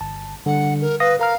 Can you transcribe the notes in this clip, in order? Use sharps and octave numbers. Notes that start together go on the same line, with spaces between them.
G1 A5
D3 G3 F#5
A#4
B4 F5 D#6 A#6
A#4 F5 A#5 F6